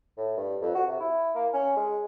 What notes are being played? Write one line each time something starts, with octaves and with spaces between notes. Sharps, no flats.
A2
G2
F2
F#4
C3
E4
A#3
C#4
G#3